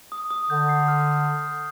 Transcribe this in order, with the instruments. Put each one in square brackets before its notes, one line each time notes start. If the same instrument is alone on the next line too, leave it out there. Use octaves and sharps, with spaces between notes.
[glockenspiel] D#6
D#6
[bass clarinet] D3 [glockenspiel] G6
[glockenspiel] C7
F6